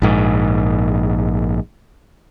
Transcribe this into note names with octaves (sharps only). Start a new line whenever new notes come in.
A#1 G#2